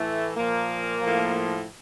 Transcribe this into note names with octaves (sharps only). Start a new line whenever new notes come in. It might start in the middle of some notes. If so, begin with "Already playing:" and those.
Already playing: A2 E3 A3
A#2 F3 A#3
A2 F3